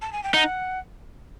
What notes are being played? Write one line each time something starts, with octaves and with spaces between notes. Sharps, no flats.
A5
G#5
G5
D#4 F#5